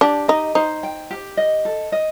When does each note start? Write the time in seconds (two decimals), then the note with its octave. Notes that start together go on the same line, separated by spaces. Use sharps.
0.01 D4 G4
0.28 D#4 D#5
0.55 D#4 C5
0.83 G5
1.11 G4
1.37 D#5
1.65 A4
1.92 D#5